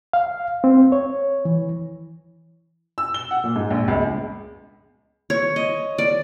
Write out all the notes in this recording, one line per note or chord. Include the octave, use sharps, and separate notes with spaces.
F5
C4
C#5
E3
E6
G7
F#5
A#2
G#2
A#1
C#2
C#5
D#5
D5